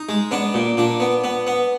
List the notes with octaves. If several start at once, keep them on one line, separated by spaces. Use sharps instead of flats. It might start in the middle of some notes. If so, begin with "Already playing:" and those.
Already playing: D#4
G#3
B3 D4
A#2
A#2 D4
B3
B3
B3